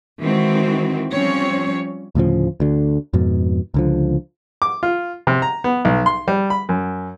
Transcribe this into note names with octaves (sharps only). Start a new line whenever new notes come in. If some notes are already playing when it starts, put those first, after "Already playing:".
D#3 E3 G#3 C4 F#4
F3 G3 C4 C#4 C#5
D2 A2 C#3 F3
D2 D3
F2 G#2 B2
C#2 D3 F3
D6
F4
C3
A#5
B3
B1
C6
G3
B5
F#2